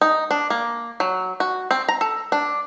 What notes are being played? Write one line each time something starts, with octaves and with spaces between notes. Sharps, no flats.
D#4
D4
A#3
F#3
F#4
C4
A#5
A4
D4